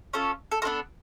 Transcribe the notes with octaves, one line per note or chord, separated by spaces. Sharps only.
C#4 F4 A4
A4
B3 D4 F4 A4 A#4